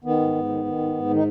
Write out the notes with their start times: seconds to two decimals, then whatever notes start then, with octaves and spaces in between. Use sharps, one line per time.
0.04 D#3 B3
0.19 G#2
0.35 G#2
0.49 D#3
0.65 D#3
0.79 G#2
0.94 G#2
1.10 D#3
1.16 D#4